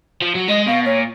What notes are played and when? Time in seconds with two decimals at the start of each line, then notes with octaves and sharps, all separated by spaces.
0.22 F3
0.35 F#3
0.48 G#3 D#5
0.67 B2 F5
0.86 A#2 C#5